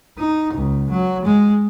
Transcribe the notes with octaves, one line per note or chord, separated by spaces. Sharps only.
D#4
C#2
F#3
G#3